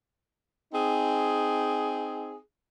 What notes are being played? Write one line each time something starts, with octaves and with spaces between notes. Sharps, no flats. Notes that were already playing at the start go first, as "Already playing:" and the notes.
C4 D#4 G#4